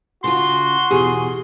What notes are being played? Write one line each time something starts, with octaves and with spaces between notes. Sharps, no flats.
C#3 F4 F#4 C6
E2 B2 G4 G#4